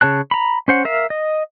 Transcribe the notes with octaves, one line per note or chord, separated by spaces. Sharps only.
C#3 C#5 A5 F#6
A#5 B5
C#4 C5 F#5
A#4 E5 F5
D#5